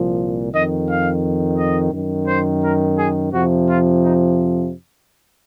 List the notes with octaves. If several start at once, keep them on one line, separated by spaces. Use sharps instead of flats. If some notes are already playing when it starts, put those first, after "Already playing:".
Already playing: C2 A#2 F3
F2 D#3 D#5
F5
D#5
F#2 D#3
C5
A#4
G#4
F2 C3 F3 F#4
F4
D#4